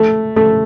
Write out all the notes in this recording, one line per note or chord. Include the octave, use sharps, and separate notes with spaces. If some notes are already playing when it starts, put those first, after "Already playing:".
Already playing: A3
A3